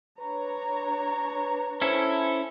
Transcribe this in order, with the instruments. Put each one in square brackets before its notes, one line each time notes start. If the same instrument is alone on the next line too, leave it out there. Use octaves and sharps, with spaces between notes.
[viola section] D4 C#5 A#5 [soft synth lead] B4
[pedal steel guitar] C#4 E4 A4 [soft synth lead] C5